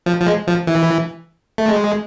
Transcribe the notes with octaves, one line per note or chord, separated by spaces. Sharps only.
F3
F3
G#3
F3
E3
A3
G#3